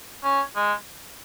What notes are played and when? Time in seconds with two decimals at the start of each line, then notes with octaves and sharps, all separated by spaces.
0.24 C#4
0.56 G#3